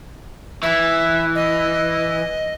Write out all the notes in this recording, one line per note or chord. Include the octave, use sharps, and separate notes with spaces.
E3 E5
D#5